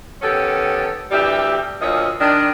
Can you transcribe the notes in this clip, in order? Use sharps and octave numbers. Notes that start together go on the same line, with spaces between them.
D#3 B3 C#4 G4 A4
D2 E3 G3 G4 E5
D2 A#2 F3 C#5 D#5
D#3 G#3 D4